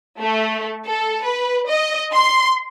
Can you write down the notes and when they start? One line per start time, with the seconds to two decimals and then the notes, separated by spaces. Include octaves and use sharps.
0.19 A3
0.86 A4
1.23 B4
1.68 D#5
2.13 C6